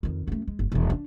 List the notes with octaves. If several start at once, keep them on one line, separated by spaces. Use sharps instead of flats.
F2 D#3
F#2 A3
G#3
G1
E1 E3
D4